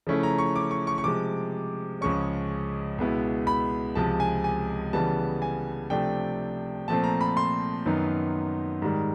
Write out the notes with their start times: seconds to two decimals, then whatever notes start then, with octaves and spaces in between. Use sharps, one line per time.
0.07 C#3 F3 A3 C#4 E4
0.23 A#5
0.38 C#6
0.56 D6
0.71 C#6
0.87 C#6
0.98 C#6
1.04 C3 F3 G#3 D6
2.01 C#2 C#3 F3 G#3 C#4 C#6
2.98 C#2 B2 G#3 B3 E4
3.47 B5
3.95 C#2 C3 F3 G#3 A5
4.20 G#5
4.44 G#5
4.93 C#3 E3 G3 B3 A5
5.42 G#5
5.90 C3 F3 A3 D4 G5
6.88 A#2 F3 A3 C4 A5
7.04 A#5
7.21 B5
7.37 C6
7.85 F#2 D#3 F#3 B3 D#4
8.82 G#2 D#3 G3